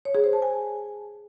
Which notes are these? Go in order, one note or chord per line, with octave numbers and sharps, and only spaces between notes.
C#5
G#4
C5
A5
G#5